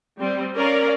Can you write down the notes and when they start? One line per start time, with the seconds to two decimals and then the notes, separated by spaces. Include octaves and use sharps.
0.19 G3 C4
0.54 C#4 A#4 D5 F5